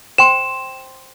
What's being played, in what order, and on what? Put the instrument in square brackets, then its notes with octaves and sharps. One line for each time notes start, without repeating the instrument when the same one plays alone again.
[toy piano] C5 G5 C6 [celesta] E7